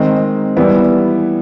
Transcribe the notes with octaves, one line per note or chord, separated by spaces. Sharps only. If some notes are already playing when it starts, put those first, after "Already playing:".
Already playing: D#3 G#3 C4 D#4
E3 G3 B3 E4